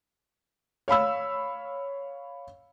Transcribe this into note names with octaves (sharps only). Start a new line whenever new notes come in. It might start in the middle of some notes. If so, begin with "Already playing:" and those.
C#5 F5 B5 E6